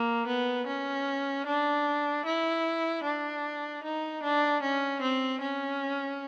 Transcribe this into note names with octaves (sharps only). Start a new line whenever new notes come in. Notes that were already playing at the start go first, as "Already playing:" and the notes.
Already playing: A#3
B3
C#4
D4
E4
D4
D#4
D4
C#4
C4
C#4